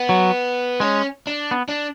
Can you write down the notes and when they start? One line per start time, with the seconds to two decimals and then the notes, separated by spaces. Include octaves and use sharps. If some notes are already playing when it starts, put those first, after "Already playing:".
Already playing: B3
0.09 F#3
0.80 G#3 C#4
1.27 D4
1.51 B3
1.69 D4